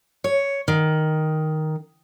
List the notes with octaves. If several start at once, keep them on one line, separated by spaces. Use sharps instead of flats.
C#5
D#3